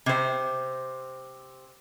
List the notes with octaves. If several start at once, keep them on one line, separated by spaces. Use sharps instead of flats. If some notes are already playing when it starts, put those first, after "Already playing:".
C3 C5